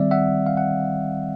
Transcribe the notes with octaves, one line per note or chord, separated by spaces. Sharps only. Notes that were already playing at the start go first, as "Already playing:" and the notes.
Already playing: D#3 G3 C4 D5 E5
E5 F#5
F5
F#5